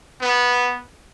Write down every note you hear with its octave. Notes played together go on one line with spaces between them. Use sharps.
B3